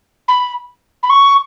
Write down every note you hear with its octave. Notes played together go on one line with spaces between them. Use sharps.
B5
B5
C#6